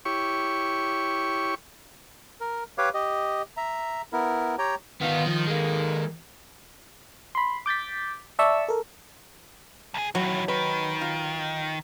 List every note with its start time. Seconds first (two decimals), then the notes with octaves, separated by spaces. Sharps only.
0.05 E4 G4 C#5 C#6
2.41 A#4
2.78 G4 B4 C#5 F5 D6
2.94 G4 D#5
3.57 E5 A#5
4.13 B3 E4 A#4
4.58 G4 C#5 G5 A#5
5.01 D#3 B3 F4
5.26 F3
5.47 G#3 A#3
7.35 B5 C6
7.66 D6 G6 A6 B6
8.39 D5 E5 A5 C#6 E6
8.69 A4 A#4
9.94 B1 G#4
10.15 D#3 E3 F#3
10.48 D#3 B4
11.01 F4